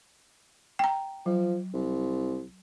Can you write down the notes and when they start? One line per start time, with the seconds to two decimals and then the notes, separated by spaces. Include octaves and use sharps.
0.79 G5 A#5
1.26 F3 F#3
1.73 C2